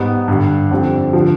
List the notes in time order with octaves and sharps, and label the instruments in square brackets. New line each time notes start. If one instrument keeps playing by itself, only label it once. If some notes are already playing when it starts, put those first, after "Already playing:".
Already playing: [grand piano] G#2 G3 B3 D#4
G2 D3 G3
F2 D3 G3 C4
D3 F3